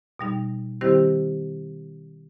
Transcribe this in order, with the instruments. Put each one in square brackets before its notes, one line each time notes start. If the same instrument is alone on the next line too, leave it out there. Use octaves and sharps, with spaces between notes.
[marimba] B2 G3 D#4
D#3 G3 C4 E4 G4 C5